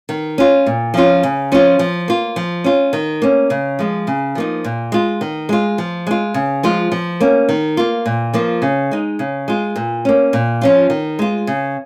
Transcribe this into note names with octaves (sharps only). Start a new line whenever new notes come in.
D#3
C#4 F4
A#2
F3 C#4 F4
C#3
F3 C#4 F4
F3
A#3 F4
F3
C#4 F4
D#3
A#3 C#4
C#3
F3 G#3
C#3
F3 A#3 D#4
A#2
G#3 F4
D#3
G#3 F4
F3
G#3 F4
C#3
F3 G#3 F4
F3
A#3 C#4
D#3
A#3 F4
A#2
F3 A#3 F4
C#3
G#3 D#4
C#3
G#3 F4
A#2
A#3 C#4
A#2
F3 C#4 F4
D#3
G#3 F4
C#3